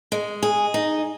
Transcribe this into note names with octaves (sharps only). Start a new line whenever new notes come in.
G#3
G#4
D#4